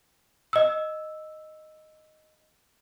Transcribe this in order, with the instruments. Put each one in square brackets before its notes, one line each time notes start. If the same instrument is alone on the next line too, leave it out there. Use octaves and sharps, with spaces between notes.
[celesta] D#5 E6